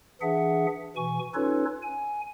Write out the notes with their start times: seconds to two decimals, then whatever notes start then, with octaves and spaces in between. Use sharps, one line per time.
0.21 E3 D4 G#4 E5 F#5
0.96 B2 E3 G#5 C#6
1.34 C#4 D#4 F4 A4 B4 C#5
1.83 G#5